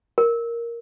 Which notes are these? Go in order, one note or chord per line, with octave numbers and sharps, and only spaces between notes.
A#4